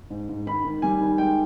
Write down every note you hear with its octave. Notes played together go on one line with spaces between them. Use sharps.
G#2
G#2
D#3 B5
D#3
G3 G#5
D#3
G#3 G5